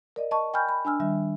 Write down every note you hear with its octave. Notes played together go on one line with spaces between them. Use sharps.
A#4 D5 D#5
D#5 A5 C#6
G5 G#5 B5 C#6 F6 G6
B5
D4 G#5 E6 F6
D#3 G3 E5